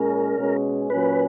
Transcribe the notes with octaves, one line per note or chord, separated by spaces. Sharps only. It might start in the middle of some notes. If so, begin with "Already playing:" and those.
Already playing: A#2 G#3 C#4 A#4
B2 G#3 C#4
A#2 F#3 C#4 B4